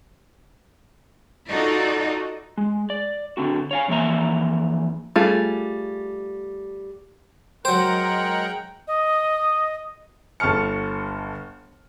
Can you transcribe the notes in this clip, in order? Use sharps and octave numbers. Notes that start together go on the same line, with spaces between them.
D#4 F4 F#4 A4 D5 D#5
G#3
D5
D3 C4 F#4
C#5 F5 G#5
F2 E3 A#3 E5 A#5
G3 A3 F4 G#4
F#3 G#3 A#4 C5 F#5 G5
D#5
G1 A5 C#6 F6 C#7